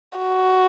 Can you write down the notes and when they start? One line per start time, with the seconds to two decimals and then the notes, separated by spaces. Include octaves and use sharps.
0.19 F#4